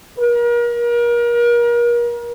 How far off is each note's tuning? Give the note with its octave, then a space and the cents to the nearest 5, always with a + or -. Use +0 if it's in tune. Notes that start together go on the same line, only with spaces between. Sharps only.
A#4 +35